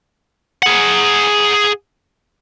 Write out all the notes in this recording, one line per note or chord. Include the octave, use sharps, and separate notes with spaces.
G#4 F#5